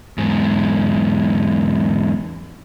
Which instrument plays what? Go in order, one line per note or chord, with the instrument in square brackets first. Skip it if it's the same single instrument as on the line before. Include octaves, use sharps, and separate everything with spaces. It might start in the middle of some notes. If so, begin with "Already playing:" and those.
[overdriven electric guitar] E2 G#2